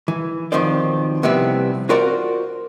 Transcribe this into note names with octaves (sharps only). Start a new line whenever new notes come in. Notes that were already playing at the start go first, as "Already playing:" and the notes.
E3
B1 D#3 F3 C4 C5 D5
C3 E3 F3 G3 B3 C4
F4 F#4 A#4 C5 D5 F#5